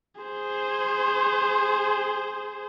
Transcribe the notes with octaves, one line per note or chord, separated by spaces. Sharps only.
G#4 C5